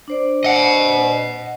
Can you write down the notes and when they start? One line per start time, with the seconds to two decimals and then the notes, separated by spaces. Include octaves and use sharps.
0.08 D4 C5 D5
0.44 D#5 F#5